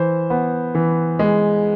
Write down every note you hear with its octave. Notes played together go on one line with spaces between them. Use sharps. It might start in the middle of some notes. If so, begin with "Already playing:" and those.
Already playing: E3 C5
B3
E3
G#3